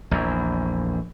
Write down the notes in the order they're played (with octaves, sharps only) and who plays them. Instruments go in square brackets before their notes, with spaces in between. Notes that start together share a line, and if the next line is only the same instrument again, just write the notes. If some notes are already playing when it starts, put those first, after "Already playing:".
[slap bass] A#1 E2